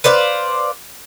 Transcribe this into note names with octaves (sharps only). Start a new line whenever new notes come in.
B4 C5 D5 F5